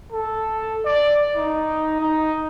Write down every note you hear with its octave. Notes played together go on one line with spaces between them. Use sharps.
A4
D5
D#4
D#4